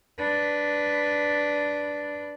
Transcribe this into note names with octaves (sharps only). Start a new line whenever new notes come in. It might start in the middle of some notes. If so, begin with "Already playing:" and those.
D4 B4